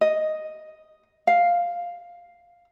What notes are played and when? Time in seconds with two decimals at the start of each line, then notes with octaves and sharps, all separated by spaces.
0.01 D#5
1.27 F5